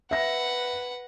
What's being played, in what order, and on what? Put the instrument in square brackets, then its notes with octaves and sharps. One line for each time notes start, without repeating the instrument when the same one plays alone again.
[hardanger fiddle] B4 F#5 [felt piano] E5 A#6